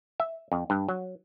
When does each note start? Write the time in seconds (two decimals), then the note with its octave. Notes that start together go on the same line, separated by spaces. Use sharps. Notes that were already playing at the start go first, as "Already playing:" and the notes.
0.20 E5
0.52 F2
0.70 G2
0.89 F#3